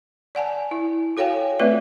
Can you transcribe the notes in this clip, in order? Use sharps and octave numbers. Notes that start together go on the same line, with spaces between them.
D5 F#5 G#5 A5
E4
F#4 A4 C#5 F5 G5 G#5
A3 C4 F4 B4 D5 E5